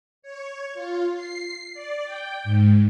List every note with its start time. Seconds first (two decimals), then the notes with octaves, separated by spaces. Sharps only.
0.22 C#5
0.74 F4
1.15 C7
1.74 D5
2.05 G5
2.44 G#2